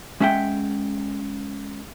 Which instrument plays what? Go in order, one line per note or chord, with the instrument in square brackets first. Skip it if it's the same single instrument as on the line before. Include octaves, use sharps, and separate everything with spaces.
[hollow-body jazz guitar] G#3 C#4 E5 F#5 G5